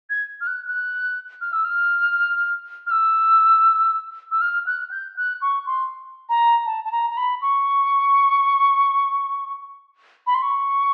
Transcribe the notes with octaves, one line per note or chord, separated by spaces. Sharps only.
G#6
F6
F#6
F#6
F6
E6
F6
F6
E6
E6
F6
F#6
G6
F#6
C#6
C6
A#5
A5
A5
A#5
A#5
B5
C#6
B5
C6
C#6